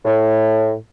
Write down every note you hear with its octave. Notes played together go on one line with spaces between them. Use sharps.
A2